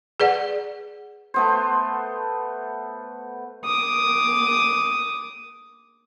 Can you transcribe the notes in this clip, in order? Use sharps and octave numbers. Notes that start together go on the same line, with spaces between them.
G#4 B4 D5 F#5
A3 B3 C5
D6 D#6